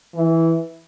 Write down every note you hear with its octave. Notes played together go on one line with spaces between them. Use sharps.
E3